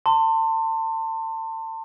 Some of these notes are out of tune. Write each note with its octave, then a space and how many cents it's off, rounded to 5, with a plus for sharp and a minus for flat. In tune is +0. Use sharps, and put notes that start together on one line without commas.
A5 +35 C6 +0